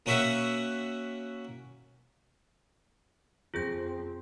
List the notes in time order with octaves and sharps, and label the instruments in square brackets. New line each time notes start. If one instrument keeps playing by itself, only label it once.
[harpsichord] A#3 C#4 F#4 E5 F#5
[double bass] F2 C4 [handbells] F4 G#4 G6